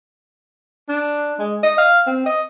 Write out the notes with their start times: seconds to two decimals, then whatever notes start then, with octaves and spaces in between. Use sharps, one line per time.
0.88 D4
1.39 G#3
1.63 D#5
1.78 F5
2.06 C4
2.26 D#5